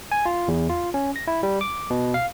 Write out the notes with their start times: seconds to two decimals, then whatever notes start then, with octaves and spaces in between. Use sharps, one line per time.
0.12 G#5
0.26 F4
0.48 E2
0.69 F4
0.94 C#4
1.16 A#6
1.27 E4
1.43 G3
1.61 D6
1.90 B2
2.14 F5